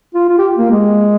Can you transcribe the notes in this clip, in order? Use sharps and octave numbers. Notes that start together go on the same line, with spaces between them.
F4
F4
G4
A#3
G#3